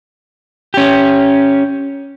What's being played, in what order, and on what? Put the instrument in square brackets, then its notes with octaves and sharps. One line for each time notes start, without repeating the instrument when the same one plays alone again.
[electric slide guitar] C#4 G4